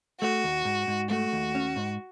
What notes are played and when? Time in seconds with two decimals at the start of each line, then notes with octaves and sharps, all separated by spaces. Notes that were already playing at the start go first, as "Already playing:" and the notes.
0.21 A3 F#4
0.44 D#2
0.65 G#2
0.88 G#2
1.10 A3 F#4
1.33 D#2
1.55 C#4
1.76 G#2